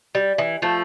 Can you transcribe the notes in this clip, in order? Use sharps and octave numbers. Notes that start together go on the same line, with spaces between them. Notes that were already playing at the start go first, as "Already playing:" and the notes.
G3
E3
F3 A3